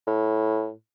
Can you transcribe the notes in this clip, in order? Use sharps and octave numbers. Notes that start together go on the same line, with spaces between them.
A2